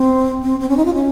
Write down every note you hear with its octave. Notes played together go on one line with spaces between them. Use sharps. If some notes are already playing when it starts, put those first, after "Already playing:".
Already playing: C4
C4
C4
C#4
D#4
F4
C#4